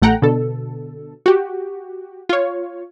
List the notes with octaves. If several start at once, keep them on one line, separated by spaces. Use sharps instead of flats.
A1 A3 F#5 G5 A#5
B2 D3 A4
F#4 G4
F4 C#5